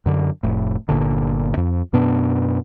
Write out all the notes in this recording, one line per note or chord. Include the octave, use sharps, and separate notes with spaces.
F#2 D3
F1 A2
G1 A#2 D3
F2
F#2 B2 B3 D4